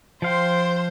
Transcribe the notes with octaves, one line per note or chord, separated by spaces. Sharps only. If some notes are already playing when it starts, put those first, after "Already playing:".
F3 C5 F5 G5 C6